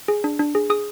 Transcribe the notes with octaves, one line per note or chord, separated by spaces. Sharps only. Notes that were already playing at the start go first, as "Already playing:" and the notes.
G#4
D4
D4
G#4
G#4 D#6